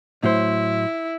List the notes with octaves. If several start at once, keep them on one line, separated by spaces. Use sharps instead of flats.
A2 F#3 E4 C5